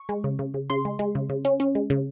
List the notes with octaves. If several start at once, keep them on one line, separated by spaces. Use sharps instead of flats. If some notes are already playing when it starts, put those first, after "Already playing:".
Already playing: C#6
G#3
C#3
C#3
C#3
C#3 C6
G#3
G#3
C#3
C#3
C#4
C#4
G#3
C#3